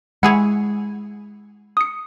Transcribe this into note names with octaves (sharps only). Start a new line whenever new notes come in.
G#3 E4 G#4 C#5 F#5 G#5
D#6 C#7